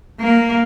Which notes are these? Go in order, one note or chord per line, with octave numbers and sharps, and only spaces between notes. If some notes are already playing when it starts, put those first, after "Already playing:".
A#3